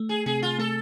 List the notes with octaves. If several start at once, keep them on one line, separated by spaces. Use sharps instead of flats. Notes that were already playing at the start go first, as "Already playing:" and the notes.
Already playing: A3
G#4
C3 G#4
F4
A3 A4